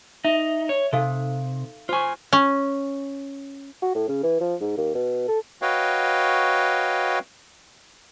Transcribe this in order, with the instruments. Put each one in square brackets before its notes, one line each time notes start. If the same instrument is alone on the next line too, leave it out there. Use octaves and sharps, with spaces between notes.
[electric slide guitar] D#4 [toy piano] E5
[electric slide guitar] C#5
[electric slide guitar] C3 [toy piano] D#4 A4 F5
[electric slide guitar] F4 G#5 [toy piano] C5 C#6
[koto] C#4
[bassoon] F#4
A2
C#3
E3
F3
G#2
D#2
B2
A4
[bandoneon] F#4 B4 C#5 D#5 F5 G5